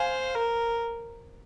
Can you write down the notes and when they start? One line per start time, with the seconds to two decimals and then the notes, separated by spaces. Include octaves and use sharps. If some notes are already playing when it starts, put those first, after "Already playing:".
Already playing: C5 F5 G#5
0.35 A#4